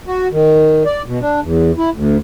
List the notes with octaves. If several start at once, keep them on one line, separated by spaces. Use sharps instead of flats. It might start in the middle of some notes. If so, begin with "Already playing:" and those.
F#4
D#3
D5
B2
D4
E2
E4
D2